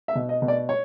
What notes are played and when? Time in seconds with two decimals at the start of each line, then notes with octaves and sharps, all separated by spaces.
0.08 E5
0.15 B2
0.29 D#5
0.42 B2
0.48 D5
0.69 C#5